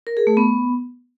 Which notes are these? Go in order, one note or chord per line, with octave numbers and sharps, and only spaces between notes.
A#4
G#4
A3
B3